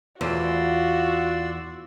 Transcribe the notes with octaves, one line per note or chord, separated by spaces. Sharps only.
E2 F4 F#4 D5 C6 E6